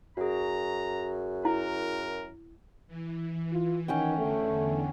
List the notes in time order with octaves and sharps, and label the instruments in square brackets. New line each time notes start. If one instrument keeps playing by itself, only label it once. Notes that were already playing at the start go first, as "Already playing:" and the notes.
[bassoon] F#2 [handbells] F#4 G#4 [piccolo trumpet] A#5
[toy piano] E4 [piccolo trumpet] A#4
[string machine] E3
[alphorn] F4
[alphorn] D#3 [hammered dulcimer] C#4 F#5 G5
[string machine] E2 D3 [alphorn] A3